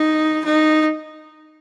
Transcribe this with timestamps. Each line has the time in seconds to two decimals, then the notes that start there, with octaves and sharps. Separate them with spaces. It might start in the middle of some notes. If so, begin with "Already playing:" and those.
Already playing: D#4
0.45 D#4